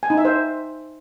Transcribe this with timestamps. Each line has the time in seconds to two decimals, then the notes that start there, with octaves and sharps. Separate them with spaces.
0.03 G#5
0.10 D#4
0.17 E5
0.25 C5